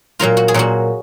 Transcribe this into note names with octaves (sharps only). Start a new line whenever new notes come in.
A#2 F#3 A#3 F4
F#4
G#4
A#2 F#3 A#3 F#4